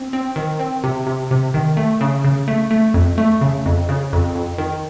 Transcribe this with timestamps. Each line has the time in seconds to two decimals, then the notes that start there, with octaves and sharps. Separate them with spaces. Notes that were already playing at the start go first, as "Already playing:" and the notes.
Already playing: C4
0.13 C4
0.36 D#3
0.59 C4
0.84 C3
1.07 C3
1.31 C3
1.54 D#3
1.77 A3
2.01 C#3
2.24 C#3
2.48 A3
2.71 A3
2.94 F2
3.18 A3
3.41 C#3
3.66 F2
3.89 C#3
4.13 F2
4.35 F2
4.58 D#3